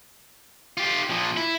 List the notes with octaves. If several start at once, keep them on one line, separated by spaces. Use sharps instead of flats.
F4 G4
A#2 F3
E4